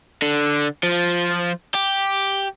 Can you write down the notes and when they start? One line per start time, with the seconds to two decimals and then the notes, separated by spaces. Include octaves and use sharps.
0.22 D3
0.83 F3
1.74 G4